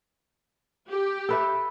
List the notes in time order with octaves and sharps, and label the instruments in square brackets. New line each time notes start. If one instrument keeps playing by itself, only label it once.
[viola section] G4
[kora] A4 B4 E5